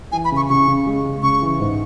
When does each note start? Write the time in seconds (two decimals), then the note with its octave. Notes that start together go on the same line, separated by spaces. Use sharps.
0.12 E3 G#5
0.25 B5
0.31 C#3 C#6
0.50 C#3 C#6
0.68 C#3
0.86 G#3
1.05 C#3
1.23 C#3 C#6
1.42 E3
1.59 G#2